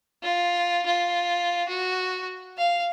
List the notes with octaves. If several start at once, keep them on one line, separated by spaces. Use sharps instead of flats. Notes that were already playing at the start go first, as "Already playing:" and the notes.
F4
F4
F#4
F5